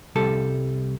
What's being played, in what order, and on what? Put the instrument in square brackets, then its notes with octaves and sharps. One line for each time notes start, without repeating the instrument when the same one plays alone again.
[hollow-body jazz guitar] C2 G3 A4